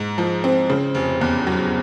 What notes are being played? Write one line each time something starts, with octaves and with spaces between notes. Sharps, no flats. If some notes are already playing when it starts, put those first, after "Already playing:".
Already playing: G#2
F3
C4
C#3
F1
E2
F#3